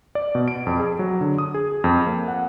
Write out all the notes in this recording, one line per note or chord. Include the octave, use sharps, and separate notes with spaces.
D5
B2
D7
F2
G#4
F#3
D3
D#6
G#4
F2
A#3
F#5